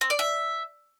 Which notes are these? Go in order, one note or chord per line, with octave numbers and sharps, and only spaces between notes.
C4
D5
E5